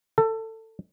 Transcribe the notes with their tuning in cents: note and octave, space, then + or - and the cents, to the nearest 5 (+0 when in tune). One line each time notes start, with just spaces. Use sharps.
A4 +20